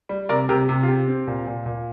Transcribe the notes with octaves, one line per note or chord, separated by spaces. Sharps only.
G3
C3 A#4 D5
C3 G4 A#4
C3 G4
F4
C4 G4
C4
A#2
A#2
A#2